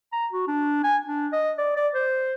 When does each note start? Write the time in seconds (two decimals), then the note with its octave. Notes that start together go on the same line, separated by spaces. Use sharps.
0.12 A#5
0.32 F#4
0.47 D4
0.83 G#5
1.06 D4
1.32 D#5
1.58 D5
1.77 D5
1.94 C5